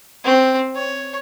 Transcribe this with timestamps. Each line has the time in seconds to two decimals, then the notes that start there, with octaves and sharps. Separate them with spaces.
0.24 C4
0.75 C#5